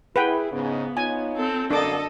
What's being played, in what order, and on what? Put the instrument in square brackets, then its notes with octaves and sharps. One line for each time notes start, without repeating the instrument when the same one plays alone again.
[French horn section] E4 G#4 [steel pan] B4 F#5 G5
[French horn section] G#2 C#3 [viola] B3
[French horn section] D#4 F4 C#5 [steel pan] G#5
[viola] C4 A4
[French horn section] F#2 D3 A#3 [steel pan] D4 D6 [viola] A4 D#5